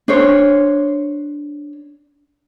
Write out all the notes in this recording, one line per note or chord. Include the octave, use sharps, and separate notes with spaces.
D4 C5 C#5